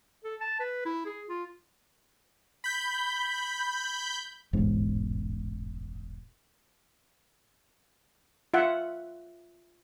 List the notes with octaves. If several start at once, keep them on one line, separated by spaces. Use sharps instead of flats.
A4
A5
B4
E4
G#4
F4
B5 G6
E1 A1 G#2
F4 E5 F#5